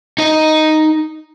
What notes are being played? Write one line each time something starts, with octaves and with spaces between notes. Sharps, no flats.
D#4 D#5